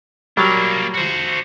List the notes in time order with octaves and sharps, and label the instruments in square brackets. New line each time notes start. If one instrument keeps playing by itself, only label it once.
[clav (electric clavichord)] F#3 G3 [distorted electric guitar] A#3 D4
[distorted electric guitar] F#4 C5